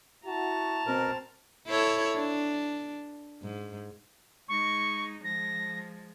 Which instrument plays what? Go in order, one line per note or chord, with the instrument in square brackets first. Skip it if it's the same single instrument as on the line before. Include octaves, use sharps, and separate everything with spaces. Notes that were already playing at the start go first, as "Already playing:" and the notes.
[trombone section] E4 F#4 [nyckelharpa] A5 A#5
[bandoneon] B2 A#4 [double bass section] C4
[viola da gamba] E4 A4 C#5
D4
G#2
[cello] G#3 D#4 [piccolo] C#6
[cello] F3 G#3 [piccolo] A#6